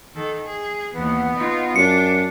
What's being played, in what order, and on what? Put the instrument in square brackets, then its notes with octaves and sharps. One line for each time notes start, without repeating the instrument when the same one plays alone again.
[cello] D#3 A4
G#4
[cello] D#2 E3 [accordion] B3
[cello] D#4 F4
[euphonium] F#2 [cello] D4 [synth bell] C#7